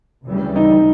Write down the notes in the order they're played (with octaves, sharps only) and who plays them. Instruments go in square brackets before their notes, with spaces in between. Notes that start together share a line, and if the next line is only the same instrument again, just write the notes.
[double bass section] D2 C#3 E3 G3
[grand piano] D#4